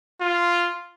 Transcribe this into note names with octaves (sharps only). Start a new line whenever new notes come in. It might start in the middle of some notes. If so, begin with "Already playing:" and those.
F4